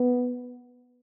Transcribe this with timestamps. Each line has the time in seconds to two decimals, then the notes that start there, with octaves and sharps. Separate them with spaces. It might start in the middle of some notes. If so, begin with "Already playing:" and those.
Already playing: B3